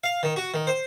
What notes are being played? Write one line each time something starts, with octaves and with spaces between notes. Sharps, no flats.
F5
D#3
F#4
D#3
C5